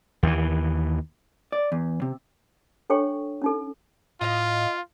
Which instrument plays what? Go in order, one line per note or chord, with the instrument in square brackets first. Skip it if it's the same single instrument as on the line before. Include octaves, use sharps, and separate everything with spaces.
[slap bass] D#2 E3
[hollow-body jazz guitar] D5
E2
C3
[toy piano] D4 A4 C#5 G5 C#6
C#4 D#4 A4
[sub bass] A2 [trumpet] F4 [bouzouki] D#5 F5